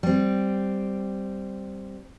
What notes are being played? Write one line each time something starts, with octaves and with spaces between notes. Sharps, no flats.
G3 C4